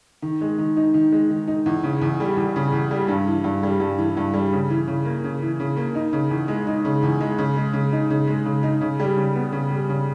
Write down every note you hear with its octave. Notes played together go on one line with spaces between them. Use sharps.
D#3
G#3
D#3
D#4
D#3
G#3
D#3
D#4
E2
C#3
E2
G3
E2
C#3
E2
G3
G2
E3
G2
G3
G2
E3
G2
G3
C#3
E3
C#3
A#3
C#3
E3
C#3
A#3
D#4
C#3
E2
G#3
D#4
C#3
E2
G#3
C#3
G#3
C#3
D#4
C#3
G#3
C#3
D#4
C#3
G3
C#3
B3
C#3
G3
C#3